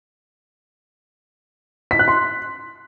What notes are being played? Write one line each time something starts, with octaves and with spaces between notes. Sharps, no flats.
B6
F#6
C6